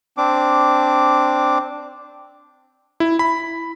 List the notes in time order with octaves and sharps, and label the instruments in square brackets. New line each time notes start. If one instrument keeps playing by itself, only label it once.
[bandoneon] C4 D4 D6
[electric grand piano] E4
B5